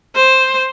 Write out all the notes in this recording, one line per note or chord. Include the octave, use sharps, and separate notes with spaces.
C5